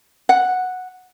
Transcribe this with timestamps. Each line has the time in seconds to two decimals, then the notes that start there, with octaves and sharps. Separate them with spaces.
0.29 F#5